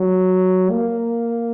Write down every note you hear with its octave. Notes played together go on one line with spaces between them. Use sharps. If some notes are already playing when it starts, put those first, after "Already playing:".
Already playing: F#3
A#3